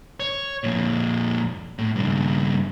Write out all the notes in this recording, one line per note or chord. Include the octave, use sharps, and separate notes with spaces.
C#5
F2 A#2
A2
G2 C#3